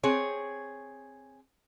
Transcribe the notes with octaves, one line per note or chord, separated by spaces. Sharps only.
C4 G#4 C#5